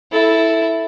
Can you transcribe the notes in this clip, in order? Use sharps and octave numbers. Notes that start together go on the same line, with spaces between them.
E4 A4